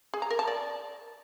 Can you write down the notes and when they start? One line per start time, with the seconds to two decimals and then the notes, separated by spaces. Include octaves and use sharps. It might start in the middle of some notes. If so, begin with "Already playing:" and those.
0.14 G#4
0.22 A#5
0.30 A#4
0.39 A5
0.47 D5